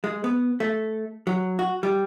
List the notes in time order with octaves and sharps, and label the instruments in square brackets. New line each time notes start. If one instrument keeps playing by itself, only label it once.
[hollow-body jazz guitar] G#3
B3
A3
F#3
F#4
G3